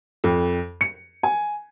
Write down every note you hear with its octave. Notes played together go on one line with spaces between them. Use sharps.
F2
C#7
G#5